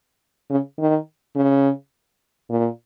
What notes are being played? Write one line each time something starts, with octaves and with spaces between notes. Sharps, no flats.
C#3
D#3
C#3
A#2